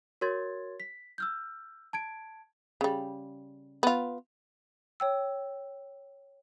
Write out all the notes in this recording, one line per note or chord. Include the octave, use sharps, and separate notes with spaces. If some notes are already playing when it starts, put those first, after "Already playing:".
F#4 A#4 C#5 C6 G#6 A6
B6
E6 F6 G6
A5 G#6 D7
C#3 G3
B3 F4
C#5 G5 E6